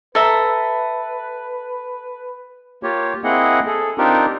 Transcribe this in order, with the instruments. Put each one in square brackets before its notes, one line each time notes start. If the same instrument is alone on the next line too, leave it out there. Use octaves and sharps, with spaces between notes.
[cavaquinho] A4 E5 A#5 [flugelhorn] B4
[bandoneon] A#3 F4 G4 C#5
A#3 C4 E4 G#4 D#5 F#5
G#4 A4
C4 D4 D#4 F4 G4 A#4